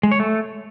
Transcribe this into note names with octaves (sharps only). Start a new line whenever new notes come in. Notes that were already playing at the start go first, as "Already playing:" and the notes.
G#3
C#5
A3